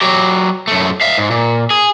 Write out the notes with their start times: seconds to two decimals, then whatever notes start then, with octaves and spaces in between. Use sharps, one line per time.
0.01 F#3 G4
0.68 F#2 A3
1.01 E5 F5
1.18 G#2
1.31 A#2
1.70 G#4